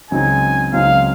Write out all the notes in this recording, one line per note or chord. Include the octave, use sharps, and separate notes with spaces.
C#2 C#3 F#3 C4 D#4 G#5
C#2 C#3 F#3 C4 D#4 F5